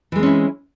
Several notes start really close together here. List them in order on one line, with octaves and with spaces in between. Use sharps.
E3 G#3 C4 C#4 E4